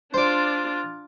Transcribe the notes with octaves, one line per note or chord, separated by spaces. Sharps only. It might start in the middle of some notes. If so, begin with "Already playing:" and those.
D4 F4 C5 D5